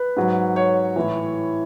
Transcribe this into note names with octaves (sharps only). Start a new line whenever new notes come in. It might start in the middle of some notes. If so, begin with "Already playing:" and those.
Already playing: B4
G#2 F#3
C#5
A2 E3